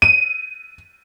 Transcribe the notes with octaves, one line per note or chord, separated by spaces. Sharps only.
D#7